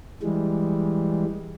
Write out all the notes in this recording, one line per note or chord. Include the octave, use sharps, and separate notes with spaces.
E3 G3 G#3